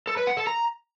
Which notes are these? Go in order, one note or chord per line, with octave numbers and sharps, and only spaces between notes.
A4
B4
F#5
A4
A#5